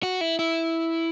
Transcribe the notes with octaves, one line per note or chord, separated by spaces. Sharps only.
F#4
E4
E4